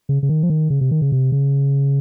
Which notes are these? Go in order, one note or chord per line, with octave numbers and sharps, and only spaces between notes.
C#3
C#3
D#3
F3
D#3
C#3
C3
D#3
C#3
C3
C#3